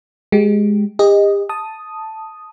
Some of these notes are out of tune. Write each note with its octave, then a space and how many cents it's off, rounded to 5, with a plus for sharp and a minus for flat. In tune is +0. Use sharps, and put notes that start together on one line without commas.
G#3 +0 G4 -20
G4 +40 D#5 +0
A5 +0 D#6 +0